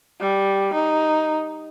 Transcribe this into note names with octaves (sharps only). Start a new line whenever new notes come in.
G3
D#4